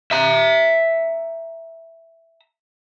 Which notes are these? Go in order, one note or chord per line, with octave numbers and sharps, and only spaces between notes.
E5 A#5